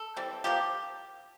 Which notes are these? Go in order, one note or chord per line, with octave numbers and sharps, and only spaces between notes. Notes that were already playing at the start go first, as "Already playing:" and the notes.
Already playing: A4
E3 G3 C4
F3 A#3 G4